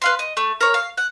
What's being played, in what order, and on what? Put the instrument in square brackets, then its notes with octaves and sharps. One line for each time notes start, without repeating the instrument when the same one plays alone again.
[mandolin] B4 F5 C6
D#5
A3
A#4 C#5
F5
F#5